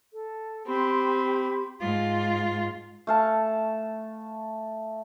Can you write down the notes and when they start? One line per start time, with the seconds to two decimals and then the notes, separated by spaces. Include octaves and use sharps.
0.14 A4
0.67 C4 G4 B5 C6
1.81 G#2 F4
3.07 A3 F5 A5